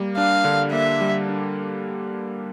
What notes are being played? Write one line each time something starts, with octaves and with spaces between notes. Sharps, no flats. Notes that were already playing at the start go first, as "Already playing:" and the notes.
Already playing: G3 A#3
D4 F5
D3
A#3 E5
G3
D4